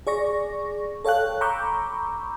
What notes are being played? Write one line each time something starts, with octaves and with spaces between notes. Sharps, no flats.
G#4 D5 C#6 A#6
A4 C#5 F5 G5 F#6
A#5 B5 C#6 D6 E6 G6